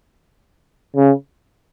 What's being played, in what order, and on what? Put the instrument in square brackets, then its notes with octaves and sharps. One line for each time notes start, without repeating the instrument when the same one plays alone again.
[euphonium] C#3